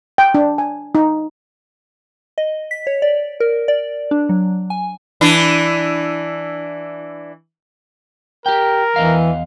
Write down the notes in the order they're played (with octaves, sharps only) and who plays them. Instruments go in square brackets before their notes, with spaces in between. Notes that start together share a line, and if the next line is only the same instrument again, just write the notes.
[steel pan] G5
D4
G#5
D#4
[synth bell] D#5
B6
C#5
D5
A#4
D5
D4
F#3
G#5
[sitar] E3 D4
[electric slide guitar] G4 G5 [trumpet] A#4
[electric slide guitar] E2 D#5 F5 [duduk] E3